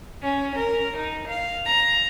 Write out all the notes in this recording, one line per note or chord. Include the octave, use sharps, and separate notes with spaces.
C#4
A#4
D#4
F5
A#5